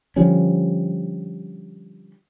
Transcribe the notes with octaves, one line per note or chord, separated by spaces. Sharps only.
D3 F3 G3 C#4